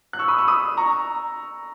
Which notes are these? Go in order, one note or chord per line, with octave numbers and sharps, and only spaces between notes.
F#6
C#6 E6
B5 D#6
C#6 E6
B5 D#6
A#5 C#6